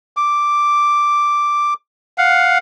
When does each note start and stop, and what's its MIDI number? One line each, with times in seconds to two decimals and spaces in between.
0.17 1.74 86
2.18 2.58 77
2.18 2.58 78